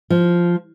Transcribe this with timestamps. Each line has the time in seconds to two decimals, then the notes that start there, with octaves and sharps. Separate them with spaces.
0.10 F3